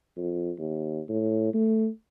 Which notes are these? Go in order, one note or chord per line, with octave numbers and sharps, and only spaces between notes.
F2
D#2
A2
A3